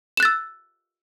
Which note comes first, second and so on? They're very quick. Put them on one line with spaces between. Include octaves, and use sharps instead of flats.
E7 F#6 A6 E6